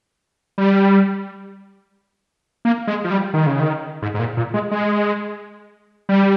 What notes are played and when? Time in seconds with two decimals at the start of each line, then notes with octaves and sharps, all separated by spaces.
0.58 G3
2.65 A#3
2.87 G#3
3.04 F3
3.11 G3
3.34 D#3
3.47 C#3
3.60 D#3
4.02 G#2
4.14 G#2
4.19 A#2
4.37 A#2
4.54 G#3
4.71 G#3
6.09 G3